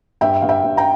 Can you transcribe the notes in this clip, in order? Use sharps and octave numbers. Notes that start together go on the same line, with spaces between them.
G2 E5 G5
G2 F5
E5 G5
G2
G5 A#5